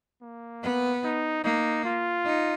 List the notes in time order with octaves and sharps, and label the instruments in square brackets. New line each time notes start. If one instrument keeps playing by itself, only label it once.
[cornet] A#3
[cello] B3
[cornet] D#4
[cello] A#3 [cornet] D#4
[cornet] F4
[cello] D#4